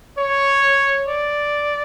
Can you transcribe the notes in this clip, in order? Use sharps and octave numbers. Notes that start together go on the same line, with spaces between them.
C#5
D5